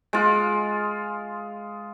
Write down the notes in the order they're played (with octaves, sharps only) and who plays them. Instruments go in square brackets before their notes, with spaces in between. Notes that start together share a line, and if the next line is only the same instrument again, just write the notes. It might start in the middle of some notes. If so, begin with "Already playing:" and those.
[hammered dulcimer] G#3 F4